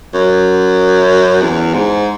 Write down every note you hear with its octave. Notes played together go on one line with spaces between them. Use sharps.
F#2
E2
G#2